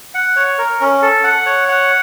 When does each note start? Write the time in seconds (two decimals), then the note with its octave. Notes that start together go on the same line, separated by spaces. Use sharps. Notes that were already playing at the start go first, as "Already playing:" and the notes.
0.15 F#5
0.36 C#5
0.58 A#4
0.81 C#4
1.02 A4
1.24 F#5
1.46 C#5
1.68 F#5